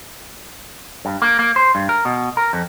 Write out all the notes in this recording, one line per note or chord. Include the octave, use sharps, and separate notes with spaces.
G2
A#3
A#3
C5
G2
A#4
B2
A#4
F2